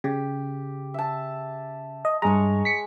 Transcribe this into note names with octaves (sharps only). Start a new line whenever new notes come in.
C#3 G4
E5 A5
D#5
G2 G#3 C#5 A#5
B6 C#7